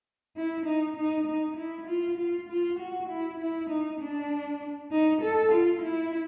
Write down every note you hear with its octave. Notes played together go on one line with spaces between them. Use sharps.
E4
D#4
D#4
D#4
E4
F4
F4
F4
F#4
E4
E4
D#4
D4
D#4
A4
F4
E4